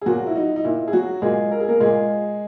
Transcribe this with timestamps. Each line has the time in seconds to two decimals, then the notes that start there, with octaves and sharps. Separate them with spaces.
0.01 G#4
0.06 A#2 F#3 F#4
0.27 E4
0.36 D#4
0.56 D#4
0.64 A#2 E4
0.88 G#4
0.93 F#3 F#4
1.22 A#2 G#3 G#4
1.51 A#4
1.60 G#4
1.68 A#3 A#4
1.80 A#2 G#3 G#4